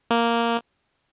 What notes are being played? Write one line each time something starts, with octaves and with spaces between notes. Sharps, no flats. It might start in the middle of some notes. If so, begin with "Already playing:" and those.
A#3